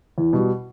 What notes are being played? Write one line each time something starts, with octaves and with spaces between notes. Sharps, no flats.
E2
B2 G3